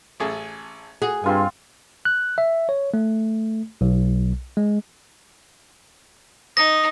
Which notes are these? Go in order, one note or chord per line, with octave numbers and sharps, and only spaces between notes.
A1 G#4 A4
F#4 G#4
G2 C4 F4 G#5
F#6
E5
C#5
A3
B1
G#3
D#4 D#6 A#6